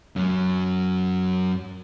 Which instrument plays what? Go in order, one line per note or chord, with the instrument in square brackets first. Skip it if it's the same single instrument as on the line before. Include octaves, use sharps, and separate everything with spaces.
[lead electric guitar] F#2 F#3